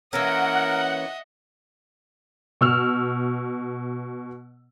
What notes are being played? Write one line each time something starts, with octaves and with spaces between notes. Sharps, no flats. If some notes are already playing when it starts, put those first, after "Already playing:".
E3 A#3 C#4 A#4 D#5 E5 F#5
B2 E6 F6